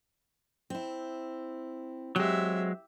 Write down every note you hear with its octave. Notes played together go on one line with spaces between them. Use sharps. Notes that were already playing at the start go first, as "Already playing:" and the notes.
C4 E4
F#3 G#3 C4 G4 E5